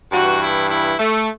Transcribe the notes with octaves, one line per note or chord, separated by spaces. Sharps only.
G2 E3 F#4
E4
E4
A3